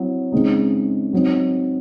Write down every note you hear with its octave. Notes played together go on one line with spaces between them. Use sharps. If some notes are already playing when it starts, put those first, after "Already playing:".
Already playing: F#3 C4 E4
C#3 G#3 C4 D#4
F#3 C4 D#4